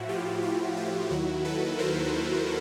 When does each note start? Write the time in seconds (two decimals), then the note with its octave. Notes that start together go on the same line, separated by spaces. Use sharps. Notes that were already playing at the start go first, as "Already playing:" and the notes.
Already playing: A2 F3 E4 F#4
0.09 F4 G4
0.43 F4 G4
0.77 F4 G4
1.10 D#2 D#3 F#3 E4 F#4
1.45 A4 B4
1.78 A#4 C5